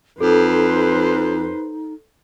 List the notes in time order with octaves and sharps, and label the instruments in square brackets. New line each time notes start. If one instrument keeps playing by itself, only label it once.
[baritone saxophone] F2 [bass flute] D#4 [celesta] A4 [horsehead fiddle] B4 C5